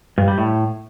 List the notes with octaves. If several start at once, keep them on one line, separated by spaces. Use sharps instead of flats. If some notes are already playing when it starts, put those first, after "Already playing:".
G2
G3
A2